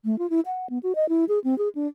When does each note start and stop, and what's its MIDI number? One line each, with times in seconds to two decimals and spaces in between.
0.05 0.18 57
0.19 0.29 65
0.30 0.40 64
0.46 0.67 78
0.70 0.78 59
0.83 0.93 66
0.95 1.08 75
1.09 1.25 64
1.29 1.39 68
1.44 1.57 60
1.58 1.69 68
1.75 1.87 62